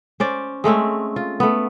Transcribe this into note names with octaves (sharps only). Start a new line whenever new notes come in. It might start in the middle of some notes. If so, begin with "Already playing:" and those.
C#4 C5 D5
G#3 A3 C4 C#4
F4
A3 B3